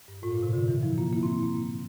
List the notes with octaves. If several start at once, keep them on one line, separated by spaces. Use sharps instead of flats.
G2
A2 F4
A#2
C3
D3
E3
F3 E4
A#3 F4
A#3 E4
C4
A#3
A#3